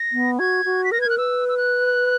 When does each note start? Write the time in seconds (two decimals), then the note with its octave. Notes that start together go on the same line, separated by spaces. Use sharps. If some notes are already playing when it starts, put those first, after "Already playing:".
Already playing: A#6
0.12 B3
0.39 F#4 G#6
0.65 F#4
0.84 B6
0.92 A#4 A#6
0.99 B4
1.01 G#6
1.06 A#4 F#6
1.18 B4 E6
1.49 E6
1.57 F#6